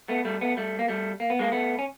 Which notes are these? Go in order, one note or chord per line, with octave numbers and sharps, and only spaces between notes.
A3 B3
G3 A3
A3 B3
G3 A3
A#3
G3 A3
A#3
B3
G#3 A#3
A3 B3
C#4